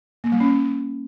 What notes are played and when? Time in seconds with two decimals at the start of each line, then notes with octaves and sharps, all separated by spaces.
0.24 A#3
0.32 G3
0.40 C#4